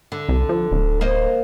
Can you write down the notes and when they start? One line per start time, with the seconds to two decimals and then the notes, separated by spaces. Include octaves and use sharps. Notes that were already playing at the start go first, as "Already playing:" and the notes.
0.12 D3
0.29 C2
0.49 F3
0.71 D1
1.01 A#3 C5 D#5